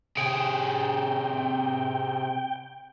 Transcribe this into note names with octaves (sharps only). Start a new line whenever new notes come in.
C3 G#4 G5